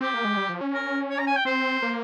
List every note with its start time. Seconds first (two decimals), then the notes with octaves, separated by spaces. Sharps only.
0.01 C4 G4
0.14 A#3
0.25 G#3
0.37 G3
0.49 F3
0.61 C#4
0.74 A#4
1.10 C#5
1.19 A#5
1.27 G#5
1.36 G5
1.45 C4 C5
1.82 A#3